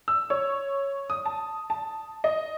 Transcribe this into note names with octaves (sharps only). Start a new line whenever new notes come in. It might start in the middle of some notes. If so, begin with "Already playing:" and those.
E6
C#5
D#6
A5
A5
D#5